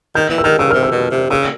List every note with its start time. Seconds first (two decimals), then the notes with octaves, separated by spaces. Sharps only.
0.15 D#3 G6
0.30 E3
0.38 E6
0.44 D#3 F6
0.58 C#3 E6
0.71 C3 F6
0.83 E6
0.92 B2
1.11 C3
1.30 C#3 E6